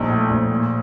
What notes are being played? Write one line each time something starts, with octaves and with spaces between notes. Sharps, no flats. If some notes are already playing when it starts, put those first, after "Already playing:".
Already playing: A#1 D#4
A2
A#1
A#2